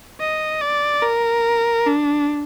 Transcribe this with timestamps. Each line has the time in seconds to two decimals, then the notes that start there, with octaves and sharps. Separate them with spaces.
0.20 D#5
0.61 D5
1.03 A#4
1.86 D4